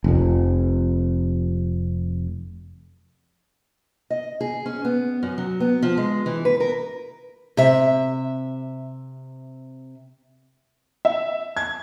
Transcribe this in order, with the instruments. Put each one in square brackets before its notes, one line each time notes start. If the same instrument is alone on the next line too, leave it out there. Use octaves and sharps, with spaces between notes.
[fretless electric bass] F1 F2
[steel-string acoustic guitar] D#5
G#4
C#4
B3
F#2
F#3
B3
F3
G#3
E3
B4
A#4
C3 E5
[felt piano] E5
G#6